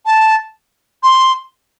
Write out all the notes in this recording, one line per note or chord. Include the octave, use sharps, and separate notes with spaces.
A5
C6